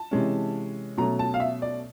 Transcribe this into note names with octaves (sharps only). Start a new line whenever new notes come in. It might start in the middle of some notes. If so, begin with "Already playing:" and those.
Already playing: A5
C3 E3 G#3 C#4
B2 F#3 A3 C#4 A#5
A5
F5
E5
D5